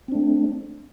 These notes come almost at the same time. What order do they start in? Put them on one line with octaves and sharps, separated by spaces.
C4 D4 A3